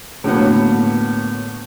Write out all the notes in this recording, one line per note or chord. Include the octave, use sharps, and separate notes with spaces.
A2 D3 F#3 A#3 B3